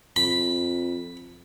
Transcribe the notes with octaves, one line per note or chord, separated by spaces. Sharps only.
F2 B5